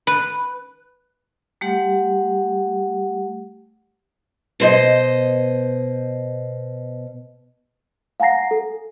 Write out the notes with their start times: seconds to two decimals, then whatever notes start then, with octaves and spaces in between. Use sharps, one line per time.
0.07 B4
1.61 G3 A3 G4 F#5
4.60 B2 C5 D#5
8.20 F5 F#5 G#5 A#5 A#6 C7
8.51 A4